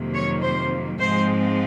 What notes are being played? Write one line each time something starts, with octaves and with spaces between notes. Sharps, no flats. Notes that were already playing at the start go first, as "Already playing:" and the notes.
Already playing: F2 C3 D#3 F#3 A#3
C#5
C5
G#2 F3 G#3 C4 C5